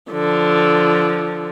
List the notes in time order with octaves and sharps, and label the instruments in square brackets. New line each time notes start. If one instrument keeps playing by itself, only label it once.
[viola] D3 F3